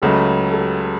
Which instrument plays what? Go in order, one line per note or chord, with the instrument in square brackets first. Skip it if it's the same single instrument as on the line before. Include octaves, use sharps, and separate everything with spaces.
[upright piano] C#2 C#3 F#3 A3 [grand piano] A4
[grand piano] A4
G4